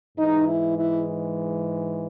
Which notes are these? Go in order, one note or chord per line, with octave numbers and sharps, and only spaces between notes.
G#2 E3 G#3 D#4
E4
E4